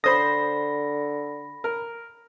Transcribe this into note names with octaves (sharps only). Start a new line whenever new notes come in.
D3 C5 B5 D#6 A#6
A#4